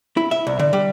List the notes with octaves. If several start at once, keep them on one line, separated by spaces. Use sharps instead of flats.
E4
E5
C2
D3
G3